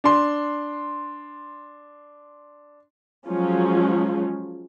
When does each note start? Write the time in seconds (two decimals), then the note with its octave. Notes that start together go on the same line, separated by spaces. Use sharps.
0.04 D4 C6
3.27 F3 F#3 G#3 C#4 F4